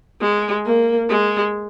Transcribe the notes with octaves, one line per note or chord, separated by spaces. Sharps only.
G#3
A#3
G#3